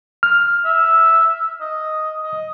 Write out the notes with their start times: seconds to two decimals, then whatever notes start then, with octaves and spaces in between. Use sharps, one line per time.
0.23 F6
0.65 E5
1.61 D#5
2.24 D#5